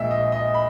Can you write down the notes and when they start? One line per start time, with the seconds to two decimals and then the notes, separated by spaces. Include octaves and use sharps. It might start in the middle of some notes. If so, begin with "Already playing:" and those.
Already playing: A#1 A#2 G#3 D#5 E5
0.11 D#5
0.32 D#5
0.54 B5